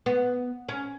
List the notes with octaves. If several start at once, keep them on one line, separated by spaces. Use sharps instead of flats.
B3
C#4